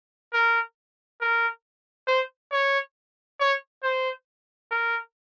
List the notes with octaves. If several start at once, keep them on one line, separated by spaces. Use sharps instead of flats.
A#4
A#4
C5
C#5
C#5
C5
A#4